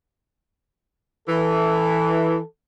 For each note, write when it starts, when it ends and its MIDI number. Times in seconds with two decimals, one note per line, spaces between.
1.28 2.37 52
1.28 2.47 69